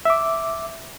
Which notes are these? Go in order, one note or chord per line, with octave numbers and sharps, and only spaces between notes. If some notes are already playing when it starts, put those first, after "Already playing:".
E5 D6